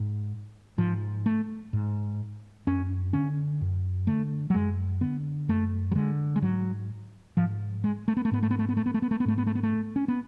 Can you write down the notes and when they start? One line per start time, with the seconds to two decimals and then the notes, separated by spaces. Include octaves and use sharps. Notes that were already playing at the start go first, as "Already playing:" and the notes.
Already playing: G#2
0.78 G#2 F3
1.26 A3
1.73 G#2
2.67 F#2 C#4
3.13 D3 C#4
3.61 F#2
4.07 D3 A3
4.50 F#3
4.54 F#2 G#3
5.01 D3 B3
5.48 F#2 A3
5.92 F#3
5.95 D3 G#3
6.36 G#3
6.42 G#2 F#3
7.37 G#2 F3
7.84 G#3
8.08 A3
8.17 B3
8.25 A3
8.31 G#2 B3
8.43 A3
8.51 B3
8.59 A3
8.69 B3
8.77 A3
8.86 B3
8.94 A3
9.02 B3
9.11 A3
9.20 B3
9.25 G#2 A3
9.38 B3
9.47 A3
9.55 B3
9.63 A3
9.96 C#4
10.08 B3